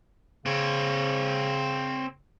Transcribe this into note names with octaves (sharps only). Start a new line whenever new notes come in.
C#3 C4 C#5